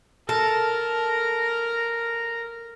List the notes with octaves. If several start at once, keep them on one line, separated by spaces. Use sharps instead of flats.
A4 A#4